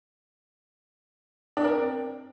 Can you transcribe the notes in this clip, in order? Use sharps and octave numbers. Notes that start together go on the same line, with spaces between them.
D4
A#4
C4